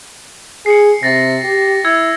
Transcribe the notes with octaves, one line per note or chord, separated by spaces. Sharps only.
G#4 C7 C#7
C3 A6 A#6
G4
E4 E6 G#6 C#7